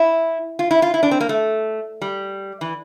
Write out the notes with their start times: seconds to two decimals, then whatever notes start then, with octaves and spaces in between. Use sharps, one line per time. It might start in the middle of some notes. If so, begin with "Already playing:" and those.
Already playing: E4
0.59 F4
0.71 E4
0.82 F4
0.94 E4
1.03 D4
1.11 C4
1.20 A#3
1.29 A3
2.02 G3
2.61 E3